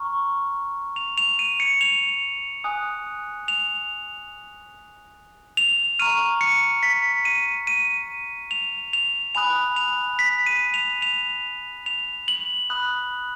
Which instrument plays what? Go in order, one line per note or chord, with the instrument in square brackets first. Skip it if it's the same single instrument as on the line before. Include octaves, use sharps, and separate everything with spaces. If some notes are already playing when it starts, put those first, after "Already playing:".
Already playing: [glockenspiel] A#5 C#6 F6
F7
F7
D#7
C#7
F7
G#5 D#6 F#6
F7
F7
A#5 C#6 F6 D#7
C#7
B6
D#7
D#7
F7
F7
G#5 B5 D#6 F#6 F7
F7
B6
D#7
F7
F7
F7
F#7
B5 D#6 F#6